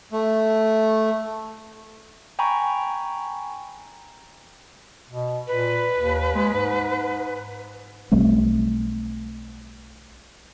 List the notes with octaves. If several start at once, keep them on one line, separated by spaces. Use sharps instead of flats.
A3
G5 G#5 A#5 B5 C#6
B2
A#2 B4
D#2
G#3
G#2
B1 G3 A3 C4